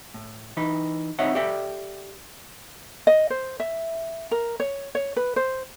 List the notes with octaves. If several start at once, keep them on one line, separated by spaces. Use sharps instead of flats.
A2
E3 D#4 B4
C4 D#4 C#5 D#5 E5 F#5
G4 A4 D5 E5 G5
D#5
C5
E5
A#4
C#5
C#5
B4
C5